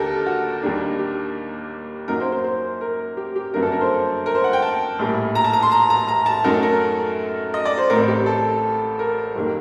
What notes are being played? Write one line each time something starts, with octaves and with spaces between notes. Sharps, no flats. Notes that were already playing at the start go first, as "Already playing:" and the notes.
Already playing: D#2 D3 G4 A4 A#4
F#4
D#2 D#3 G3 A#3 D4
G4
F#2 F#3 A#3 D#4 A#4
C5
C5
C5
A#4
G4
G4
G1 F#2 F#3 A#3 D4 A#4
A4
A#4
C5
A#4
C5
F#5
G5
A5
A#1 A2 G3 A#3
A#5
A5
A#5
C6
A#5
A#5
A#5
A5
F#2 F#3 A3 D#4 A#4
A4
A#4
D#5
D5
C5
A1 A2 A3 C4 A#4
G4
A4
A#4
F#1 D#3 G3 A#3